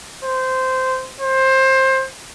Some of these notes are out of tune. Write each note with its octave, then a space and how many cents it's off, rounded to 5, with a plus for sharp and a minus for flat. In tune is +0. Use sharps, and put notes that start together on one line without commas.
C5 -15
C5 +20